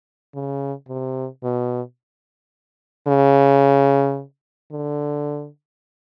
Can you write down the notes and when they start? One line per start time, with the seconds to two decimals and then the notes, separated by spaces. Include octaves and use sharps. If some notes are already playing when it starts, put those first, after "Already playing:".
0.35 C#3
0.89 C3
1.43 B2
3.08 C#3
4.72 D3